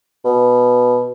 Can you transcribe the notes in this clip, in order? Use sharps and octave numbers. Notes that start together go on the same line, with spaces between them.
B2